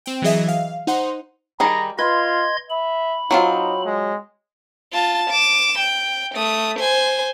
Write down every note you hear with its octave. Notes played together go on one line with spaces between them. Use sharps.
C4 G5
E3 F#3 G#4 D#5 E5
F5
D#4 C5 F#5 C6
D#3 G3 G#4 A#5
F4 B4 D#5 C6 G#6
E5 B5
F#3 C4 D#4 F4
G#3
F4 A5
D6 E7
G5
A3 D#6
C5 G#5